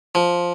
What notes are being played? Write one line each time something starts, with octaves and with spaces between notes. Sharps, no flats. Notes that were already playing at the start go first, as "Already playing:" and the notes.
F3